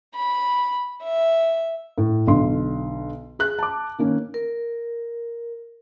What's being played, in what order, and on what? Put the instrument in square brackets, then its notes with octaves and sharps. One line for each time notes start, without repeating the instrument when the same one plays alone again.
[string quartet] B5
E5
[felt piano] A2
B1 D3 C6
G#4 F#6
A5 D6
D#3 A#3 C#4
[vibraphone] A#4